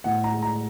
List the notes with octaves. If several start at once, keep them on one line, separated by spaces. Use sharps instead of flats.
A2 F#5
A#5
G#3
A#5